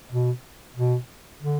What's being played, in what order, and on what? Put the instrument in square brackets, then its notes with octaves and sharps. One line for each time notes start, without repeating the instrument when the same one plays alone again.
[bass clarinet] B2
B2
D3